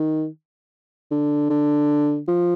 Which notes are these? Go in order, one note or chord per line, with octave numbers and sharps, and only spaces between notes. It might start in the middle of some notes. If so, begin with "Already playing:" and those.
Already playing: D#3
D3
D3
F3